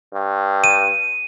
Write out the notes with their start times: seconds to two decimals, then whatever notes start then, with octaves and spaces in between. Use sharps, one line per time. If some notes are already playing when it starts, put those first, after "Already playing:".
0.14 G2
0.64 D#7